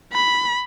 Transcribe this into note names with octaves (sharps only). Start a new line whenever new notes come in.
B5